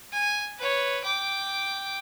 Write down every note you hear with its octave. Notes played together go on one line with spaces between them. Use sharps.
G#5
B4 C#5
G5 D6